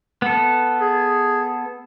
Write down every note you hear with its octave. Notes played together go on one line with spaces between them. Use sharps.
B3 A4
G#4